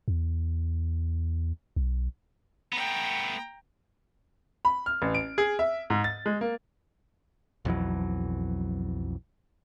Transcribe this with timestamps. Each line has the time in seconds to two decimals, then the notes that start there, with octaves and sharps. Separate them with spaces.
0.08 E2
1.76 B1
2.73 A3 B3 G5 A#5
4.65 B5
4.86 F6
5.02 A1
5.15 D7
5.38 G#4
5.59 E5
5.90 G#2
6.04 A6
6.26 G#3
6.41 A#3
7.65 B1 F2 E3 F#3